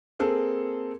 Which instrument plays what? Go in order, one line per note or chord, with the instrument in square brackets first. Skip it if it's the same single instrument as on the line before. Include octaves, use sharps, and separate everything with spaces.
[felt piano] A#3 C4 G#4 A4